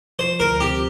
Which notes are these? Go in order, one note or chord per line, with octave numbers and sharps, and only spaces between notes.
F3 C5
D2 A#4
C4 G4